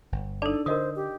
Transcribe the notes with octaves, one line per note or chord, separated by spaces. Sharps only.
G1
D4 D#4 A4 D5 A5
D3 A#4 C5 D#5 D#6
G4